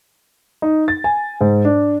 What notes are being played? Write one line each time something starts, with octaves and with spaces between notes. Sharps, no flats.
D#4
A6
G#5
G#2
D4